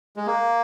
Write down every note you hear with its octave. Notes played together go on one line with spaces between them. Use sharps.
G#3
A#3